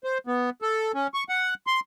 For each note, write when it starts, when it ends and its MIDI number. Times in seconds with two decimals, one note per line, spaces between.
0.04 0.18 72
0.27 0.50 59
0.62 0.92 69
0.94 1.07 61
1.14 1.24 85
1.29 1.54 78
1.67 1.80 84